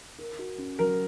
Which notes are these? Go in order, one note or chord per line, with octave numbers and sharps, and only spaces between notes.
A#4
F#4
C#4
F#3 A#4